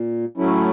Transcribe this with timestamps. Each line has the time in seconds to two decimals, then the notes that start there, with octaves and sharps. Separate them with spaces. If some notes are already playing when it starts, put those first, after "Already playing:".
Already playing: A#2
0.37 A2 F#3 A3 C#4 E4